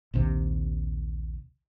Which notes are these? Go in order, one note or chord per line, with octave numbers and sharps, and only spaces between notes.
A#1 D#2 C3